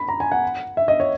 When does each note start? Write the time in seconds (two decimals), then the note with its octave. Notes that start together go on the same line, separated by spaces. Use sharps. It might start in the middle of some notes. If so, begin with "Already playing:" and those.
Already playing: B5
0.09 A#5
0.20 G#5
0.32 F#5
0.77 E5
0.88 D#5
1.00 C#5